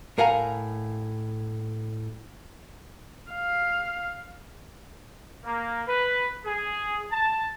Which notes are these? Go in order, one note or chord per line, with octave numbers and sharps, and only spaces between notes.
A2 A#4 F5 F#5 G#5 A#5
F5
A#3
B4
G#4
A5